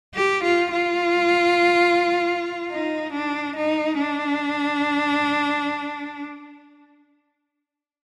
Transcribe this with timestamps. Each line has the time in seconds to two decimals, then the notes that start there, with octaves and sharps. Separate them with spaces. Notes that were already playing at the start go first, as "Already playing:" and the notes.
0.15 G4
0.44 F4
0.72 F4
2.70 D#4
3.13 D4
3.56 D#4
3.99 D4